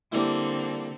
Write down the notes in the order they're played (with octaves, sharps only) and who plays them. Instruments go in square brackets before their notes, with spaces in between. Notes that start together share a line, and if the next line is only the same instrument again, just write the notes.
[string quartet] D3 C4 A4 [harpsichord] G3 A#3 E4